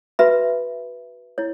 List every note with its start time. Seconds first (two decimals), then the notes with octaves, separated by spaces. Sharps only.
0.19 F#4 B4 E5 B5
1.38 E4 C#5